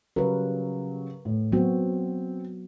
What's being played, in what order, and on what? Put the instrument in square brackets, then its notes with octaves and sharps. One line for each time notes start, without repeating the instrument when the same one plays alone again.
[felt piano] C#3 F#3 G3 [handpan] A#4 B4
[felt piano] A2
[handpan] F#3 B3 F#4 [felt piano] C4